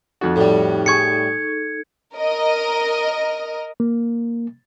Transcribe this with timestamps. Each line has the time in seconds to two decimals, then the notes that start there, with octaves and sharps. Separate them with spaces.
0.21 F2 D#4 F#4 A4
0.36 A2 G3
0.86 G#4 C#6 G#6 C#7
2.15 A#4 D#5
3.80 A#3